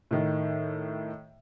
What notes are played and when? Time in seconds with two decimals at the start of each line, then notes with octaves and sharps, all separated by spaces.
0.11 A2 D#3